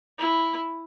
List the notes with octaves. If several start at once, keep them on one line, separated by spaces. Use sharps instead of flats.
E4